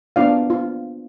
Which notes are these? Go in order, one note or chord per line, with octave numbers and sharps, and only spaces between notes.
B3 D4 F4 D5 F5
F4